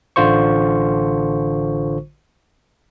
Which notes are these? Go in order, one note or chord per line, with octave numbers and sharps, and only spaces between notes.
A1 D3 F4 C5 C#6